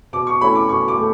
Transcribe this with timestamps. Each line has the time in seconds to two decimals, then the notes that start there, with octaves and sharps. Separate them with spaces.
0.13 B2 D6
0.27 C#6
0.41 A3 C#4 E4 B5
0.55 D6
0.69 B2 C#6
0.88 D6
0.98 A3